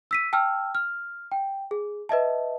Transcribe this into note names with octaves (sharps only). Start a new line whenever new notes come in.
E6 B6 D#7
G5 A5 E6 F6
F6
G5
G#4
B4 D#5 E5 A5